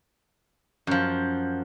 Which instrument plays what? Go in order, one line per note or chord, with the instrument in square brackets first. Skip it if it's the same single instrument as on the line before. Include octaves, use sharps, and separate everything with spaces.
[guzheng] F#2 F3